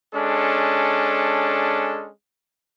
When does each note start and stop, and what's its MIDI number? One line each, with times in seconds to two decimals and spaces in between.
0.14 2.10 56
0.14 2.10 61
0.14 2.10 62
0.14 2.10 69